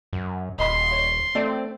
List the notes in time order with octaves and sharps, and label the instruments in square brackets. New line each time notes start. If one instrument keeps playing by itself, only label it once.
[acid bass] F#2
[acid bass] D#1 [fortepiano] D#5 B5 [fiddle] C6
[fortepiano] C#5
[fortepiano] A3 D5 [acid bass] C4